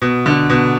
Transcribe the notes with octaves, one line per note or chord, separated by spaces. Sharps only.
B2
D3
B2